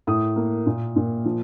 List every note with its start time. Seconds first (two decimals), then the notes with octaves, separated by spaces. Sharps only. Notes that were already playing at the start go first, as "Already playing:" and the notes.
0.07 A2 D#6
0.36 A#3
0.66 A#2
0.96 A#2
1.25 F3